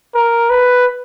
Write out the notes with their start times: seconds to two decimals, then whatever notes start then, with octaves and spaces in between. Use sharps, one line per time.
0.14 A#4
0.50 B4